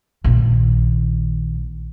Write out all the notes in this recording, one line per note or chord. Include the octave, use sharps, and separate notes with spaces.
A#1 D#3